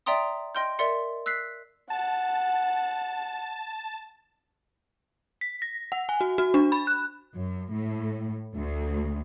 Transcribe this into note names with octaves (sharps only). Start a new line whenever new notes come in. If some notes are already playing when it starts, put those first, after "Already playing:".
D5 E5 G5 A#5 C6 D#6
D#5 G5 C6 F6 G6
A#4 D5 E5 C6 C#7
E6 F#6 B6 C7
F#5 A5
B6
A#6
F#5
G#5
F#4
F#4
D4
B5
F#6
F#2
A2
D2